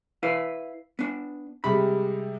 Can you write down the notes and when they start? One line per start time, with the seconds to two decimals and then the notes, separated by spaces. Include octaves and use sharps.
0.23 E4 B4 F5
0.99 B3 D4
1.64 C3 G3 G#3 B5